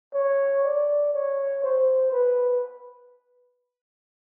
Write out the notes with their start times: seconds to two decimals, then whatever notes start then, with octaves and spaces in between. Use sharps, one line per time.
0.14 C#5
0.65 D5
1.14 C#5
1.64 C5
2.12 B4